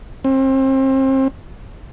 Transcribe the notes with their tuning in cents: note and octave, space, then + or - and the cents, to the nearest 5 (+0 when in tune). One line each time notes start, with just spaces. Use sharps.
C4 +30